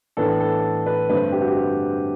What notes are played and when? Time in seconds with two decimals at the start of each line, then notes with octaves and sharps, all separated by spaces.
0.17 A2 E3 B3 D4 A4
0.40 A4
0.86 B4
1.09 G2 D3 A3 C4 B4
1.32 G4
1.41 F#4
1.48 G4
1.57 F#4